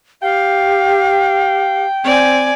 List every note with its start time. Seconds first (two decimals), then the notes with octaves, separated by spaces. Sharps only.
0.22 G4 F5 G5
2.04 C4 D5 G#5